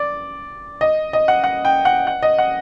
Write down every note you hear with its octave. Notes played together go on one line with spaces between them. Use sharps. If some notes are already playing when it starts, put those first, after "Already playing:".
Already playing: D5
D#5
D#5
F#5
F#5
G5
F#5
F#5
D#5
F#5